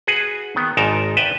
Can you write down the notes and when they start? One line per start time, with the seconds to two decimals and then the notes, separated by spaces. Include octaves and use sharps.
0.07 F#4 G#4 B4
0.56 D#3 B3
0.77 G#1 G#2 D#4 A#4 A5
1.17 B4 E5 G5 A5